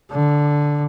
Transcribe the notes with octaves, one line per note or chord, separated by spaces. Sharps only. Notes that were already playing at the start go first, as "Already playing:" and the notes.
D3